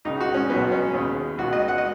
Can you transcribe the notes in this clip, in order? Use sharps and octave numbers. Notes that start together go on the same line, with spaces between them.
C#2 C#3 D#4
F#4
C#4
B1 B2 B3
C#4
D#2 C#3
C#2 B2 F#4
D#5
F#5
D#5